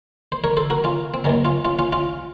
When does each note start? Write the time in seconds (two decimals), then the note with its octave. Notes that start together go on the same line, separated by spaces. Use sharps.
0.32 C5
0.44 A#4 C#5
0.57 A4 C5
0.70 F#4 A#4
0.84 C#4 F4
1.14 C4
1.24 D#2 D#3 F#3 C#4
1.45 C#4 F4
1.65 C#4 F4
1.79 C#4 F4
1.92 C#4 F4